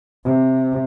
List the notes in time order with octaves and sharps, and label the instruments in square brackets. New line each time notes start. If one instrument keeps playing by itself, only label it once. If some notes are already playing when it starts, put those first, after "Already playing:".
[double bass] C3